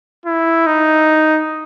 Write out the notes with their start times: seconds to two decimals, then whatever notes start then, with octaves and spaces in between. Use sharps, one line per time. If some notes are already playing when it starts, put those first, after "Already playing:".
0.26 E4
0.66 D#4